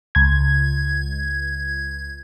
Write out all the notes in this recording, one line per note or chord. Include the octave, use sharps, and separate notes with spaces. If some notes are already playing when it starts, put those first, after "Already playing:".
C#2 G#6